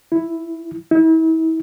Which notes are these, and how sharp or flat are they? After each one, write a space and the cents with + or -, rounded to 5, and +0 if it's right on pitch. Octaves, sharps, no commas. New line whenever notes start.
E4 +0
E4 -40